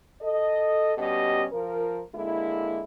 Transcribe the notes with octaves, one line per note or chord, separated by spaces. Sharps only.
A4 D#5
B2 G3 C#4 G4 D#5
F3 A#4
D3 G#3 A#3 E4